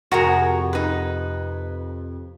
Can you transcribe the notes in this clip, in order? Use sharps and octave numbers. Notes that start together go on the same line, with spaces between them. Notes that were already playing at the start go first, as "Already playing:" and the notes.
F2 C3 F#4 G#4 A#4 A#5
D#4 B4